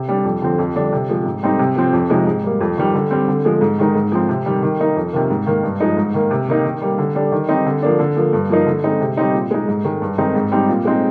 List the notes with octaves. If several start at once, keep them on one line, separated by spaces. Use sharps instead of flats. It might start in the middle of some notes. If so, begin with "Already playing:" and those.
Already playing: C3
G3 D4
F2
D3 F3 C4
F2
D3 G3 D4
C3
F3 G#3
G#2
G3 C4 D#4
C3
F3 C4
F2
C3 F3 G#3 D#4
G#2
G3 A#3
F2
D#3 G3
D3
G3 C4
D3
F3 G#3
G#2
D#3 G#3 D#4
G#2
F3 C4
C3
D#3 G3
D#3
A#3 D#4
F2
C3 D#3 A#3
G#2
D#3 A#3
G2
F3 G#3 D#4
G#2
D#3 A#3
C3
D#3 A#3 D#4
D#3
G3 A#3
D3
G3 D4
D#3
G3 C4 D#4
D3
F3 A#3 D4
D3
F3 A#3
G2
F3 A#3 D#4
D3
G#3 C4 D#4
C3
G3 C4 D#4
A#2
G#3 D#4
G#2
D#3 G#3
G2
D#3 G#3 C4 D#4
G#2
G3 C4 D#4
A#2
G#3 C4 D#4